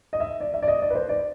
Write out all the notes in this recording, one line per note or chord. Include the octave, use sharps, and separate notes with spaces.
D#5
E5
D5
E5
D5
D#5
D5
B4
C5
D5